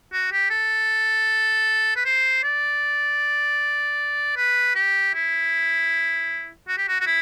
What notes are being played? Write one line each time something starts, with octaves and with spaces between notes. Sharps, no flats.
F#4
G4
A4
B4
C5
D5
B4
G4
E4
F#4
G4
F#4
F#4
E4